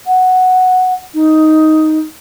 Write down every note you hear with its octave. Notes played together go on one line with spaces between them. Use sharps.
F#5
D#4